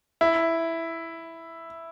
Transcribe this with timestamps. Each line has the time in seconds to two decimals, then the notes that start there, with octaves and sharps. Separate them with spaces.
0.21 E4